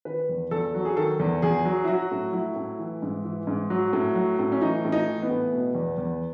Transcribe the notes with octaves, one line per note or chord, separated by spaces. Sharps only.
D#3 B4
E2
E2 A4
F#3
G#4
D#3 A4
E2
E2 G#4
F#3
E4
F#3 F#4
A2
F#3 E4
A2
E3
G#2
E3
G#2
F#3
A2
F#3
A2
C#4
E3 D#4
A2
D#4
E3
B3
A2
B2
E2
E2